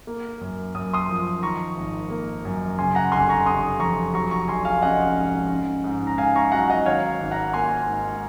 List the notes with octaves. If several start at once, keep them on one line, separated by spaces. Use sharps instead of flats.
A#3
F#2
F#2 D#6
C6 D#6
F3
D#3 A#5 C#6
G#1
A#3
F#2
C#3 G#5 C6
F#5 A#5
F1 G#5 C6
A#5 C#6
F1 C6 D#6
F2 A#5 C#6
F#3 A#5 C#6
A#5 C#6
A#1 G#5 C6
F5 G#5
C#4 D#5 F#5
G#2
C#4
G#2
A#5
G#2 F5 G#5
A#5 C#6
F#3 F#5 A#5
D#5 F#5
D#3 C#5 F5
G#1
F#5 A#5
A#3 G#5 C6
G#2